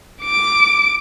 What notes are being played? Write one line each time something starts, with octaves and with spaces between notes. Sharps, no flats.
D6 D7